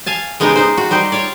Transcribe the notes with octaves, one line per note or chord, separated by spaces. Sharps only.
F5 G#5 A5
C#3 G#3 B3 D#4 F4 G4
D#4 C5
F#4
G3 D#4 G4 C5
F4 C#5 D5